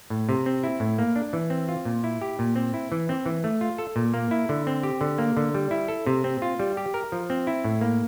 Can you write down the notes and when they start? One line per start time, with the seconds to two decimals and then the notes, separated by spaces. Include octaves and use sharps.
0.10 A2
0.29 C3
0.46 C4
0.64 E4
0.80 A2
0.98 A#3
1.16 D4
1.33 E3
1.50 C4
1.69 F4
1.85 A#2
2.04 E4
2.21 G4
2.39 A#2
2.56 C4
2.74 E4
2.92 E3
3.09 C4
3.26 E3
3.44 A3
3.61 F4
3.78 A4
3.96 A#2
4.14 A#3
4.31 E4
4.49 D3
4.67 C4
4.83 G4
5.01 D3
5.18 A#3
5.37 D3
5.55 G3
5.71 E4
5.88 A4
6.07 C3
6.24 C4
6.42 F4
6.59 G3
6.77 G4
6.94 A#4
7.12 F3
7.30 C4
7.47 E4
7.64 A2
7.81 A#3